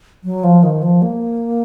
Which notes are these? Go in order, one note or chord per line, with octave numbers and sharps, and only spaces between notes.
F#3
F3
D#3
F3
A#3